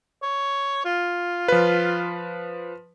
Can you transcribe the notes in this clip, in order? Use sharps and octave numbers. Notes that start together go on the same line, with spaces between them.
C#5
F4
F3 B4